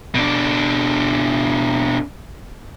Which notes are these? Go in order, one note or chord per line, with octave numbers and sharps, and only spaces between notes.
B2 D4